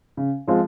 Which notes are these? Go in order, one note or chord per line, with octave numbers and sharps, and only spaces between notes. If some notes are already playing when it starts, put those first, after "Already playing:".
C#3
F3 G#3 C4 F4